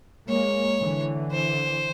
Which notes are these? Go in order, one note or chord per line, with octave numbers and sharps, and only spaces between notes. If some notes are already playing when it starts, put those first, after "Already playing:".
G#3 A#3 C#5
D3 E3
C5